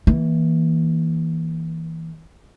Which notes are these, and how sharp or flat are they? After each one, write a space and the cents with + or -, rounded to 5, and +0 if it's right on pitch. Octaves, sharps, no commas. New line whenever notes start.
E3 -20 A#3 +0